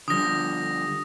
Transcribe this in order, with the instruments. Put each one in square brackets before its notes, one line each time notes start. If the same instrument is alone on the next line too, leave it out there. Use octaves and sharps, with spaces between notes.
[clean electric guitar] D3 F3 G3 [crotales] D#6 A#6